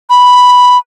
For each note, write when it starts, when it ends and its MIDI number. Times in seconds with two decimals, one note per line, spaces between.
0.10 0.78 83